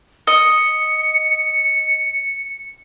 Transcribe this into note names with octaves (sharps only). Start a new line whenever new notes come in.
D#5 C#7